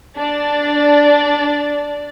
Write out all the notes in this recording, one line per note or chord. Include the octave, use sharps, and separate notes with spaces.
D4 D5 A6